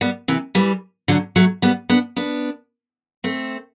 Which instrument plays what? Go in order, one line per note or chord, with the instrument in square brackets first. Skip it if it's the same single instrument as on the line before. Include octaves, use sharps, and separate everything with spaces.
[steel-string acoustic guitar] G3 B3
C3 E3
E3 G3
D3 F#3
F#3 A3
G3 B3
B3 D4
B3 D4
A3 C4